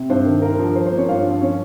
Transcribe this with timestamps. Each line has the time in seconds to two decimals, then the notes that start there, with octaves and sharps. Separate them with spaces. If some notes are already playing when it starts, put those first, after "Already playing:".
Already playing: C3
0.10 G2 C5
0.26 D#3
0.42 G2 A#4
0.58 F3
0.75 F3 C5
0.86 C5
0.91 A#3
0.97 C#4 C#5
1.08 G2 F4 F5
1.25 F3
1.41 C#4 C#5